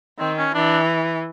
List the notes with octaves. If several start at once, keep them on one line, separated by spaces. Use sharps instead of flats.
D#3 C4
C#4
E3 D4